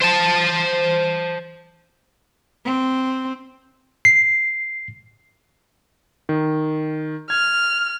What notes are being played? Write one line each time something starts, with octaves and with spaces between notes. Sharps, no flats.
C5 A5
C4
C7
D#3
F6 G#6